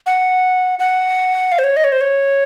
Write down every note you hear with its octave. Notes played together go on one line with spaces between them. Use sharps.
F#5
F#5
F5
C5
C#5
D#5
C#5
C5
C#5